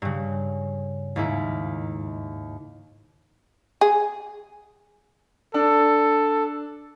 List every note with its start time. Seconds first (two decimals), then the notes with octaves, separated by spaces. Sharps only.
0.02 G2 C#3
1.16 D#2 G#2 E4
3.81 G#4
5.54 D4 A4